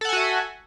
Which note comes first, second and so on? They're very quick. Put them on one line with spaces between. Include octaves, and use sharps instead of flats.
A4 F#5 G#5 F#4 E5